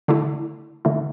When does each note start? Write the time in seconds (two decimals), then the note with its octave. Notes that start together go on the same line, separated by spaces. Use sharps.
0.08 D3 A3 E4
0.85 D3 A3 E4